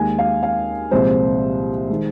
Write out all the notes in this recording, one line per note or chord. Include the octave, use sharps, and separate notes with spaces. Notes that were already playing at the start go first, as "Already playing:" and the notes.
Already playing: D#2 D#3 G#3 G#5
F5
F5
C2 A#2 F3 G#3 C5
D#3 G#3